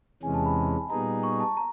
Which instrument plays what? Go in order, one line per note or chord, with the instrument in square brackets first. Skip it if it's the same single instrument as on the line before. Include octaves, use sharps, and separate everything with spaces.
[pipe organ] E2 C3 E3 G#3 C#4 [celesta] G#5
[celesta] A5
B5
[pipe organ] A#2 G3 B3 D#4 G#4 [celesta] A#5
[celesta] C#6
A5
A#5